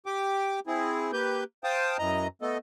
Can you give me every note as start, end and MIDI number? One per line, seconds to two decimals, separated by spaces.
0.06 0.60 67
0.06 0.60 79
0.06 0.60 86
0.67 1.11 60
0.67 1.11 64
0.67 1.11 68
1.13 1.44 58
1.13 1.44 67
1.13 1.44 71
1.13 1.44 91
1.64 1.97 72
1.64 1.97 77
1.64 1.97 79
1.64 1.97 81
1.64 1.97 87
1.99 2.27 42
1.99 2.27 52
1.99 2.27 75
1.99 2.27 82
2.42 2.58 57
2.42 2.58 59
2.42 2.58 69
2.42 2.58 75